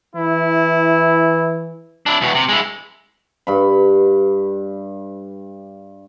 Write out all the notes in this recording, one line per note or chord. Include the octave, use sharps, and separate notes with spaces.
E3 E4
D4 E4
E2 B2
C3
G#3 E4
G2 B5